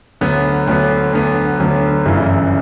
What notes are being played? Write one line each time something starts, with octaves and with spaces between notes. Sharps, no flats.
D2 D3 F#3 B3
D2 D3 F#3 B3
D2 D3 F#3 B3
D2 D3 F#3 B3
G1 F#2 C#3 E3